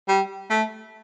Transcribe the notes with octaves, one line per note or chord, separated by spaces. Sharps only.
G3
A3